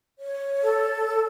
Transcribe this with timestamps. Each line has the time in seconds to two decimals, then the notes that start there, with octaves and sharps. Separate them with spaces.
0.19 C#5
0.61 A4